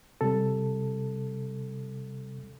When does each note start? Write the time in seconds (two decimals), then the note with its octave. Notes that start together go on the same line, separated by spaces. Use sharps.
0.21 C3 G3 A4